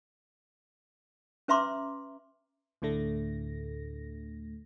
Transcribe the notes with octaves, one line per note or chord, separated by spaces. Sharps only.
C#4 B4 E5 A#5 C6 D6
D2 A2 D3 A3 A#6